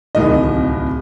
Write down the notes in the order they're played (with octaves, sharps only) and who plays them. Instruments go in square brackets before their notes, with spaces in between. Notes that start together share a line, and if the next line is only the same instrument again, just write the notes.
[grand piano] D1 C2 D#3 D#5